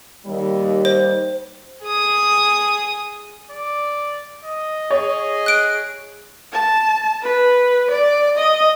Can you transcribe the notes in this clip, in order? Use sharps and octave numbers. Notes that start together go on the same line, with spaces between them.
D#2 G3
C5
G#4 D#6
D5
D#5
G#4 C#5
F#6 D7
A5
B4
D5
D#5